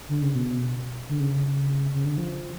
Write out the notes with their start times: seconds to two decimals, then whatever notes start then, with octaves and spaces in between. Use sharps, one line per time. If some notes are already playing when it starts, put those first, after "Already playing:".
0.09 D3
0.22 C#3
0.35 B2
1.09 D3
1.20 C#3
1.94 C#3
2.05 D3
2.17 F3